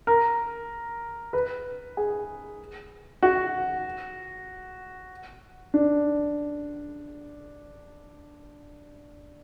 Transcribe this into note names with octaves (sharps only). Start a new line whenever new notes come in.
A#4
B4
G#4
F#4
D4